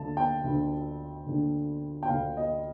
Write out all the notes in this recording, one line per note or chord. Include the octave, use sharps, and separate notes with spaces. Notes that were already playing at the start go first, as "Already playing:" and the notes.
Already playing: D2 D3 A5
G5
D2 D3
D2 D3
G5
D2 D3 F5
D#5